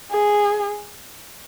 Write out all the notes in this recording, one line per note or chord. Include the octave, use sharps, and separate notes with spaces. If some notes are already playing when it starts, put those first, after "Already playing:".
G#4